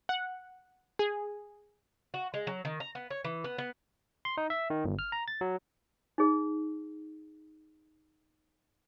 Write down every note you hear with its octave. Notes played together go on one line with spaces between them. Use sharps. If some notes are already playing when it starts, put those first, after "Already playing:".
F#5
G#4
F#4
G#3
F#3
D#3
A#5
B3
C#5
E3
B3
B3
C6
D#4
E5
D#3
G1
F6
A#5
A6
F#3
D#4 G#4